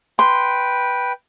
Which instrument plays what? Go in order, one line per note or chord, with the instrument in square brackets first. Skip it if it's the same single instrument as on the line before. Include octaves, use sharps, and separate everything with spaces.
[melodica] B4 G5 [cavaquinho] C6